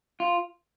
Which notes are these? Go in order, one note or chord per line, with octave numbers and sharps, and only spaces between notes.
F4